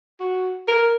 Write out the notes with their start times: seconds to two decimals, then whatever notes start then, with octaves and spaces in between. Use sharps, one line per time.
0.20 F#4
0.68 A#4